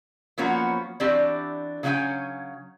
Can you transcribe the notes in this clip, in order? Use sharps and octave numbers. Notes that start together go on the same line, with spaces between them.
F3 F#3 A#3 B3 C#4 F#4
E3 C4 D4 F#4 G4 D5
C#3 F#3 C#4 F4 G5 G#5